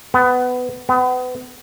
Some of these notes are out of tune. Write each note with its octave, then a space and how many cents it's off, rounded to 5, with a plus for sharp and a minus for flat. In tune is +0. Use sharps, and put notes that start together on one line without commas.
B3 +20
B3 +35